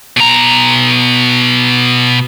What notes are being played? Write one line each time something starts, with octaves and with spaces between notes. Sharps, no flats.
B2 A#5